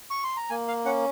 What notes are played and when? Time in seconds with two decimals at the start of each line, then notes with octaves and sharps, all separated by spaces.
0.10 C#6
0.24 C6
0.37 A#5
0.50 A#3 G#5
0.68 F5
0.85 C#4 F#5